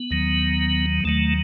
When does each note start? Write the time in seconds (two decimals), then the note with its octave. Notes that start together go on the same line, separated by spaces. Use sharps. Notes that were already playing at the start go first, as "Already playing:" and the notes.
Already playing: B3
0.11 D#2 D#3 F#3
1.05 D#2 D#3 F#3 A3